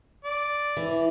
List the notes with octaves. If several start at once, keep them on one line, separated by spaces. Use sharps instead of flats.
D5
E3